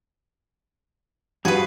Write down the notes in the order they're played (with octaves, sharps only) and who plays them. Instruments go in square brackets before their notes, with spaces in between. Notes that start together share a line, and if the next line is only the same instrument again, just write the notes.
[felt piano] G2 F3 [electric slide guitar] G3 F#4 [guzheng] G#4 B4